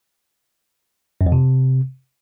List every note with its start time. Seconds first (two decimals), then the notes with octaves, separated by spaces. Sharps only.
1.21 F#2
1.26 F2
1.32 C3